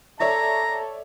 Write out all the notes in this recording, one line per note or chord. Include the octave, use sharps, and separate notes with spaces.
A4 C#5 D5 E5 A#5